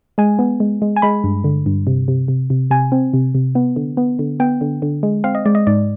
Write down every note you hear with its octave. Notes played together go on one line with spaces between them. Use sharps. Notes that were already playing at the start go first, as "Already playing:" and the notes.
G#3 G#5
B3
G#3
G#3
G#5
G#3 B5
G2
D3
G2
C3
C3
C3
C3
C3 G#5
C4
C3
C3
B3
D3
B3
D3
B3 G5
D3
D3
G#3
C4 F5
D#5
G#3 D5
D#5
G#2 D5